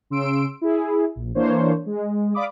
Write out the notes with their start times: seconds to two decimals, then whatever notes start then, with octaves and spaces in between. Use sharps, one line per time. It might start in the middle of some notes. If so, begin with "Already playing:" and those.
0.10 C#3 C6 E6 D7
0.61 E4 G#4
1.16 A#1
1.35 E3 A#3 D4 C5 C#5
1.86 G#3
2.34 D5 F5 B5 D6 D#6